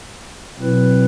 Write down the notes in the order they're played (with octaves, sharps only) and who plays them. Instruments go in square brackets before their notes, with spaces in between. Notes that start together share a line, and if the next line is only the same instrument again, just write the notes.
[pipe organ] B2 F#3 C4 E4 B4